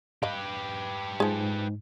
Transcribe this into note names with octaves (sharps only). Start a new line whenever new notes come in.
G4 B4 D#5 F5
G#2 F3 G#4